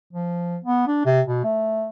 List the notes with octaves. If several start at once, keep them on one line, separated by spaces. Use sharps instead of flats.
F3
B3
D4
C3
B2
A3